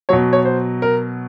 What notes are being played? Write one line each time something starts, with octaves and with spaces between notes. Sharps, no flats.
B2 F#3 C#5
C#5
C5
A#4